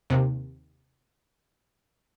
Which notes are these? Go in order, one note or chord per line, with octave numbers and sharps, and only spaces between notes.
D#2 C3